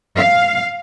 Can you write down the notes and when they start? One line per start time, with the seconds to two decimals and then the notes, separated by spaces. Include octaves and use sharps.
0.17 F5